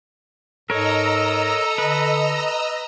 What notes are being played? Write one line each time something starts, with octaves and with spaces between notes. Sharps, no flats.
G#2 A4 A#4 C#5 D#5 A#5 E6
D3 B4